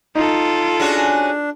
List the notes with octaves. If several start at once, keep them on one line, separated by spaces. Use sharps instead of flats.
D#4 F4 A4
C#4 D4 F#4 G#4